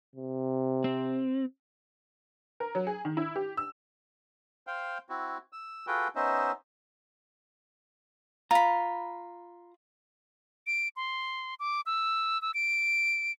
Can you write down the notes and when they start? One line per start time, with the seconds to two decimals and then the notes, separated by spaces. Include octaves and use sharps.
0.15 C3
0.84 C4
2.60 A#4
2.75 F#3
2.87 G#4
3.05 D#3
3.17 E4
3.36 G4
3.57 E6
4.67 C5 F5 G5
5.09 C4 E4 F#4
5.53 E6
5.87 F4 F#4 G#4 A4 B4 G5
6.16 B3 C#4 D#4 C5 D#5 E5
8.51 F4 A#5 B5
10.67 D7
10.96 C6
11.60 D6
11.86 E6
12.42 E6
12.54 D7